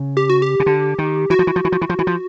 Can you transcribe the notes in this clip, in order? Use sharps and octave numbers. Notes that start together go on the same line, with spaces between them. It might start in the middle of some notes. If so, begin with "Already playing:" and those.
Already playing: C#3
G4
F#4
G4
C#3
D3
D#3
E3 F#4
F3
E3
F3
E3
F3
E3
F3
E3
F3